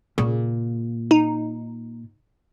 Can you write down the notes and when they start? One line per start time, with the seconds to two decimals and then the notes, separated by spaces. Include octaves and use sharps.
0.18 A#2 C#3
1.11 D#4